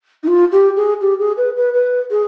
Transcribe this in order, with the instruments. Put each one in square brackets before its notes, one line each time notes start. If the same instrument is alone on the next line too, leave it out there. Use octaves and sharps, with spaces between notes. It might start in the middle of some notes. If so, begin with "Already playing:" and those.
[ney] D#4
F4
G4
G#4
G4
G#4
B4
B4
B4
G#4